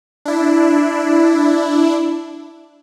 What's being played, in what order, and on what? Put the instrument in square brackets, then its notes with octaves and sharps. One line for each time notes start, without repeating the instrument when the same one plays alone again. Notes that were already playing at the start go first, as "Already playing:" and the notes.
[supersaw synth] D4 E4